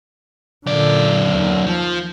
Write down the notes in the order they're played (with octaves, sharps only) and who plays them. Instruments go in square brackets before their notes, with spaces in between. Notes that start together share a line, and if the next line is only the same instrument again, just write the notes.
[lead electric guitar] F#2 D5 [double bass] A#2 D3
[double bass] D#2
[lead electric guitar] F3